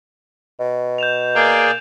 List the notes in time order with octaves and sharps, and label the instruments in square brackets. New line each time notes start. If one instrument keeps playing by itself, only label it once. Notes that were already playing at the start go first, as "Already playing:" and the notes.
[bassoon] B2
[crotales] G6 E7 F7
[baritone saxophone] A#3 [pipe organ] G#4 D5 G5